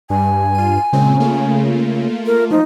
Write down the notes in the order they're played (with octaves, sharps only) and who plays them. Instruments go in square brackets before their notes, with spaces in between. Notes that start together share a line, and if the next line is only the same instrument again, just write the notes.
[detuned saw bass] G2 [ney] G#5
[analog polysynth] F4 D#7
[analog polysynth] A#2 G#3 C4 [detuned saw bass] C#3
[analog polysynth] A3 A#3 F4
[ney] A#4
[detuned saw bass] F3 [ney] D#4